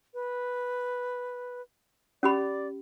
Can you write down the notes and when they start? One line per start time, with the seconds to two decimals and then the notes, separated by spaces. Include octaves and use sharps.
0.14 B4
2.23 C#4 G4 D5 B5